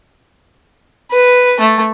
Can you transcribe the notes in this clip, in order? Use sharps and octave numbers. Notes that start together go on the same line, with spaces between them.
B4
A3